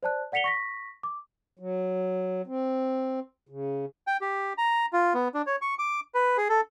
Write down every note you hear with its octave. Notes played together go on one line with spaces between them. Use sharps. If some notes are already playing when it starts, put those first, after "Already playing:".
C5 D5 A5 F#6
D5 F#5 B6 C#7 F7 G7
C#6 A#6 B6
D6
F#3
C4
C#3
G5
G4
A#5
F4
B3
D4
C#5
C#6
D6
B4
G#4
A4